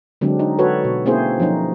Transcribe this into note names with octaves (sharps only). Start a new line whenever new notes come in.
D3 F#3 G#3 C4 D4
D#4
F#4 A4 B4 C#5
B2
A#3 C4 C#4 E4 G#4 C5
F3 F#3 C#4 D#4